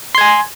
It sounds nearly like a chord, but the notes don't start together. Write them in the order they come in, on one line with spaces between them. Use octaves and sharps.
C6 G#6 G#5